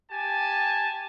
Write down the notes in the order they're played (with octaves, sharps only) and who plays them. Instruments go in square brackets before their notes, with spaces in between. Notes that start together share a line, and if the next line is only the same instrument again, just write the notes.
[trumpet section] G4 G#5 A5